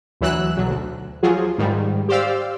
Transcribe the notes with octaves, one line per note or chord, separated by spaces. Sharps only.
D2 E3 F#3 E6 F#6
B1 F#3
D2
F3 F#3 F4 G#4
G#2 D#3 G3
G4 C5 D5 F5 E6